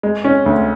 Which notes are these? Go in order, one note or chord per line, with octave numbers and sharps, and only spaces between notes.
G#3
C#4
D2